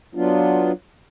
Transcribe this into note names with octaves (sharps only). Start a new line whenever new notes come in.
F#3 B3 D4 F4